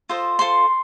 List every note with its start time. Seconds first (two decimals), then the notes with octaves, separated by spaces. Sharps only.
0.09 F4 A4 C5 D#5
0.39 F4 A4 C5 C6